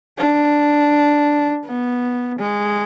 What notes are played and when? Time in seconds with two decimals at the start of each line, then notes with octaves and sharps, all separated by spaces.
0.18 D4
1.66 B3
2.39 G#3